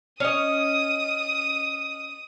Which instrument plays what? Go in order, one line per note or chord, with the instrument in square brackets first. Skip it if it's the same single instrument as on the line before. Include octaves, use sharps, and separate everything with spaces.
[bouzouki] C#4 D#5 [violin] D#6